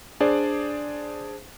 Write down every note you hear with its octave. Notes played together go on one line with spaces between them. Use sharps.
D4 G#4 C5 D5